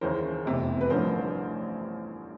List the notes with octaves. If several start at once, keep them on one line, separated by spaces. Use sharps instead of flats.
D#2 C#3 E3 A#4 C5
F1 E2 C3
B4
A1 G2 D3 F3 A#4 C5